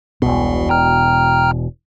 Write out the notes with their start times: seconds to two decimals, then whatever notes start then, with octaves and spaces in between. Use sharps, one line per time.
0.22 E1 C2 B2
0.69 G5 A#5 F6